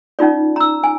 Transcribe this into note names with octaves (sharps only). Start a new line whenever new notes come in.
C#4 D#4 F4 D5
A#5 E6
G#5